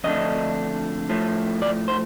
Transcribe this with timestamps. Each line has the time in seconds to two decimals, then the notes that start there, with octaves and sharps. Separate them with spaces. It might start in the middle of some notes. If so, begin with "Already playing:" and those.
0.04 F2 D3 A3 D4 D#5
1.09 A2 F3 A3
1.62 D5
1.88 C5